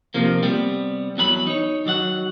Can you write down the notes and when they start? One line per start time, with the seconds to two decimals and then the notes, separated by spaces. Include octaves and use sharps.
0.14 D#2 C3 F3 A#3
0.43 C3 G3 B3
1.17 E2 F#3 G#4 B5
1.47 D#4 C#5
1.86 D#3 F#3 D5 F#5